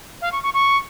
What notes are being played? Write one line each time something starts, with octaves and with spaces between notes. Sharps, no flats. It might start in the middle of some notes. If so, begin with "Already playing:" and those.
F5
C#6
C#6
C#6